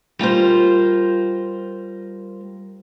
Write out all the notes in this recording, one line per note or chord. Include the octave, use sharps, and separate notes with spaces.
G3 F4 A#4 C5